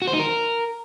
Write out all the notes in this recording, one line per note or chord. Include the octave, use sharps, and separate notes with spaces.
F#4
C5
D#4
A#4